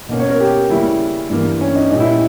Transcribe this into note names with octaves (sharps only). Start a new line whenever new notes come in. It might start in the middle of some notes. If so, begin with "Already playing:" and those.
B2 A#3 C#4
C#5
A#4
G4
C#3 G3 A#3 C#4 E4
G2 E3 A#3
C#4
D#4
A#2 G3 C#4 D#4
E4